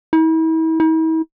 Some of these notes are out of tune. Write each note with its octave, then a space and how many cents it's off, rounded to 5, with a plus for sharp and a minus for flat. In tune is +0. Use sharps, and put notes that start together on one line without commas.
E4 -40
E4 -45